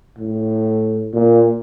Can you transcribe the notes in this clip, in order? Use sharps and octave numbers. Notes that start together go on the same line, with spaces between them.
A2
A#2